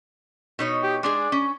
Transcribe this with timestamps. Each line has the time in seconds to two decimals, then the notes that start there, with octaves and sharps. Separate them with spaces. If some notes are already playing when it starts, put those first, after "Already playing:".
0.59 B2 D#4 C#5
0.83 G4
1.03 G#3 D4 G#4 D5
1.32 C#4